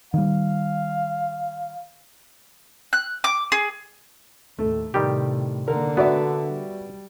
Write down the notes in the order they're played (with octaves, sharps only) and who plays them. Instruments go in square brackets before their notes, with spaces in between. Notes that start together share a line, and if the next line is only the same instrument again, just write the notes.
[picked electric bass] D#3 G3 [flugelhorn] F5
[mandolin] F#6
D6
G#4
[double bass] D#2 A2 [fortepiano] A3
[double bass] A2 C3 [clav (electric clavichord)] D#3 G3 G4
[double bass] A#2 A#3 [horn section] D3 [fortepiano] A#4
[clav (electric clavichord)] B3 [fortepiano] F#4 D5 E5
[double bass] G3